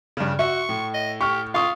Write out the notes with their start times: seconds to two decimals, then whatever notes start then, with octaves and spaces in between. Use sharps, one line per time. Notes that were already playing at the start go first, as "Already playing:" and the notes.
0.17 G2 C#3
0.39 F#4 E5 C#6
0.69 A2
0.94 D#5
1.21 G4 C#6 F6
1.54 F4 F5 C#6 D#6